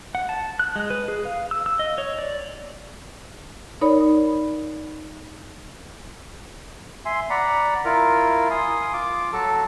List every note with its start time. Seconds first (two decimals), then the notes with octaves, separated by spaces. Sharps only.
0.15 F#5
0.29 A5
0.59 F#6
0.76 G#3
0.90 B4
1.08 G#4
1.25 F5
1.51 E6
1.66 E6
1.79 D#5
1.98 C#5
2.19 D5
3.81 D#4 A#4 C#5 D5 B5
7.05 E5 G#5 C6
7.30 D5 F#5 A#5 B5
7.85 E4 F4 A#4
8.51 G#5 C6 D#6
8.93 F4 D6
9.33 F#3 F#4 A4 A5